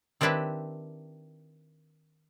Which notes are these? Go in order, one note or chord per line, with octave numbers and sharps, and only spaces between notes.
D#3 C4 D4 E4 G4 B4